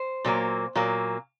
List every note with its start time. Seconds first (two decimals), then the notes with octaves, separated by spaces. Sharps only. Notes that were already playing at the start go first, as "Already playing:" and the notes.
Already playing: C5
0.25 A#2 F#3 A#3
0.75 A#2 F#3 A#3